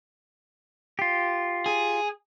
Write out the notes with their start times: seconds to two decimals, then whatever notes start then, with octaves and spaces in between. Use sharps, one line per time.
0.99 F4 G4
1.66 G#4